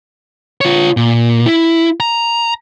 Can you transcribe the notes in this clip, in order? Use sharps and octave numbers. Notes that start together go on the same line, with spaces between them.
F4 C#5
A#2
E4
A#5